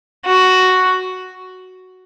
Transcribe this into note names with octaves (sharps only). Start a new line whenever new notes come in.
F#4